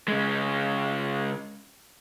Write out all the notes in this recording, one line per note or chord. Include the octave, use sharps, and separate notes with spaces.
C#3 G#3